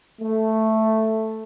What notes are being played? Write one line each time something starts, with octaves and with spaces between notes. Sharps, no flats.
A3